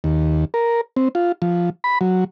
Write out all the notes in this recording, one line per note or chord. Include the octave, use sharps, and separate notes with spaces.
D#2
A#4
C4
F4
F3
B5
F#3